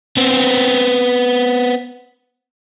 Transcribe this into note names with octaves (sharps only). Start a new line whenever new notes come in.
B3 C4